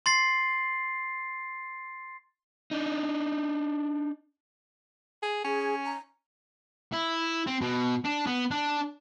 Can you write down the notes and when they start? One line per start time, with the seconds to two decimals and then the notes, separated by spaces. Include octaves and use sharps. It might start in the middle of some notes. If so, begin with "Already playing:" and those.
0.06 C6 A6 C7
2.71 D4 D#4
5.23 G#4
5.44 C#4 G#4
5.85 A#5
6.93 E4
7.47 C4
7.61 B2
8.05 D4
8.27 B3
8.51 D4